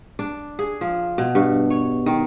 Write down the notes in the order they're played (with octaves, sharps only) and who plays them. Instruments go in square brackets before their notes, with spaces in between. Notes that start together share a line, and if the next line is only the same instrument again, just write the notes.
[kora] D4
G#4
F3
B2
G2
C#5
D#3